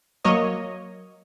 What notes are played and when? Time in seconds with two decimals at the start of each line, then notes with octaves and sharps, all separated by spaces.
0.24 F#3 A#3 C#5 D#5